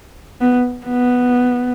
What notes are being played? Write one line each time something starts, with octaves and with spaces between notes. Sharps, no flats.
B3
B3